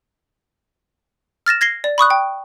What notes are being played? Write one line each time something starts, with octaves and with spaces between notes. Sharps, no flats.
F6 A6 A#6 E7
G#6 A#6 C7 G7
D5
B5 C#6 D#6 F#6
G5